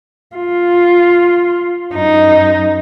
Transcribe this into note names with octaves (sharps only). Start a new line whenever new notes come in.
F4
F#2 D#4